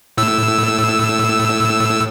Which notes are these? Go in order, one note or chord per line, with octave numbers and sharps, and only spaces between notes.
A2 E6